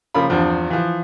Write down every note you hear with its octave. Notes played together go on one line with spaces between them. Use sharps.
C#3 F3 A#3 B5
E2 G2 F3 C4
E3 F3